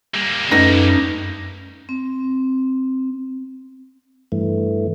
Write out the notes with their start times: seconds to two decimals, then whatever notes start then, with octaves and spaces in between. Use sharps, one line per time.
0.15 G3 A#3
0.51 F#2 A3 D#4 B4 A#6
1.89 C4
4.32 G2 E3 A3